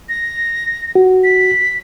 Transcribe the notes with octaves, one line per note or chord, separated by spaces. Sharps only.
A#6
F#4
B6